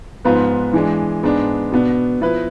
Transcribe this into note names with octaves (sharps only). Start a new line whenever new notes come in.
G#2 F3 B3 F4 B4
E3 G#3 D4
G#2 G#3 B3 D4
B2 B3 D4
F3 B3 E4 B4